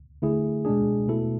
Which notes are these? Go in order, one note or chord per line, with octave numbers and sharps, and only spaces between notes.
D3 A3 E4 G#4
B2 G#3 D4 G#4
B2 A3 E4 A4